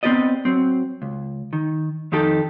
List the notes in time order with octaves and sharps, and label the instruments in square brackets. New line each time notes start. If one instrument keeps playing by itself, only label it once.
[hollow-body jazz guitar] B3 C4 E4 G4 D5 D#5
F#3 C4
C#2
D#3
F2 D#3 D#4 G4 A4